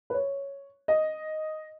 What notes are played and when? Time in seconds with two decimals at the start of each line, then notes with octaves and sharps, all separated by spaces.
0.10 B4
0.14 C#5
0.88 D#5